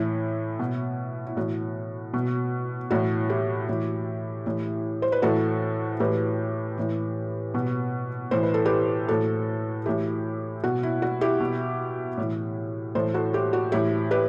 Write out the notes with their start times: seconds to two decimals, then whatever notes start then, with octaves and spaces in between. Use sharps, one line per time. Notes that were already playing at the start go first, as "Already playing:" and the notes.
Already playing: A2 E3 E4
0.59 B2
1.26 E4
1.37 A2 E3 F#4
2.14 B2
2.91 A2 E3 F#4
3.29 E4 G4
3.69 A2 E3
4.46 A2 E3
5.02 C5
5.12 B4
5.22 A2 E3 F#4 A4
6.00 A2 E3 G4 B4
6.78 A2 E3
7.54 B2
8.31 A2 E3 C5
8.43 B4
8.54 A4
8.65 G4 B4
9.08 A2 E3 F#4 A4
9.86 A2 E3 E4 G4
10.64 B2 F#4
10.83 E4
11.02 F#4
11.21 E4 G4
11.40 B2
12.17 A2 E3
12.95 A2 E3 A4 C5
13.14 F#4 A4
13.33 E4 G4
13.53 F#4
13.72 A2 E3 E4 G4
14.11 G4 B4